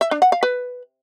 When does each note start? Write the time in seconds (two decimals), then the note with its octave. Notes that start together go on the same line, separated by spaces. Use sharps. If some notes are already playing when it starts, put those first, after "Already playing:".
0.01 E5
0.11 D4
0.22 F#5
0.32 F5
0.43 B4